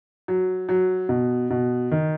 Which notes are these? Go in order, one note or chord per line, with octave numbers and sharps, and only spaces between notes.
F#3
F#3
B2
B2
D#3